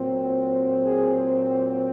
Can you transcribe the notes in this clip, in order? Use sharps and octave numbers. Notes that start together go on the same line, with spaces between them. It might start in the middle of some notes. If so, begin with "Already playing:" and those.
Already playing: A#2 F#3 C4
G#4